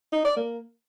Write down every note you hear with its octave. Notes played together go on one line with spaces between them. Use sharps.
D#4
D5
A#3